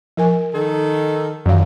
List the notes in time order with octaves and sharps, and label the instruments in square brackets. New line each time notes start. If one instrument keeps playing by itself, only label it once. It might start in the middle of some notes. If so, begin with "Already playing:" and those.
[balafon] F3 A#4 G#5
[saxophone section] D#3 A4
[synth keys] F#2 [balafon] D#3 E3 F5